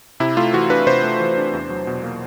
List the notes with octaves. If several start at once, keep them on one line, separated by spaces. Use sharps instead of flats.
C3 E4
A3 F4
E3 F#4
D4 B4
C3 C5
A3
E3
D4
E2
F#3
B2
A#3